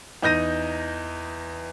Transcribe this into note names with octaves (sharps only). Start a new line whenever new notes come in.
E2 D#4 G6 A#6 D#7